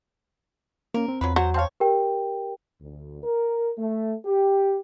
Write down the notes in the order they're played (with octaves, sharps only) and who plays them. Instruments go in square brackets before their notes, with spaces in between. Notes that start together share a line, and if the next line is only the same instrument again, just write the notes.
[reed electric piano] A#3 C#4 [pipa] A#4
[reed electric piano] C4
[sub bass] E2 [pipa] F#3 F4 B4
[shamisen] F#3 [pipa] C5
[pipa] C4 C#5 [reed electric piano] F5 A5 C6
[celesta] G4 A#4 G5
[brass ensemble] D2
A#4
A3
G4